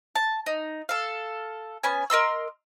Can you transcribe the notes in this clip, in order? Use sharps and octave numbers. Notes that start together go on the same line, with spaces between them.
A5
D#4
A4 F5
B3 C#4 G#5
A#4 D#5 C6 E6